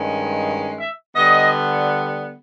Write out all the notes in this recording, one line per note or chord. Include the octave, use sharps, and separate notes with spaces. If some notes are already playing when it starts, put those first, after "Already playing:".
Already playing: G2 D#3 G#3 C#4
E5
D3 G3 B3 D#5